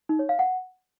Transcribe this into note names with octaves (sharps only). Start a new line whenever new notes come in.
D#4
C#5
F5
F#5